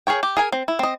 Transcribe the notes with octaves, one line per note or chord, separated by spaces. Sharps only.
G#4 A#4 C#5 G5
G4
G#4 A#4 G#5
C4
E4
C4 D#5